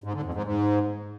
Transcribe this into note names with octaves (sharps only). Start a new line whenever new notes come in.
G#2
D3
F2
G#2
G#2